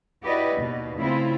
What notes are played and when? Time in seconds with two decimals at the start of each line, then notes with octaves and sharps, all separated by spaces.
0.23 E4 F#4 G4 B4 D5 D#5
0.56 D#2 B2
0.99 C#3 A3 C4 E4 F4